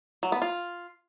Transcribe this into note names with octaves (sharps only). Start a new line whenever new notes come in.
F#3
B3
F4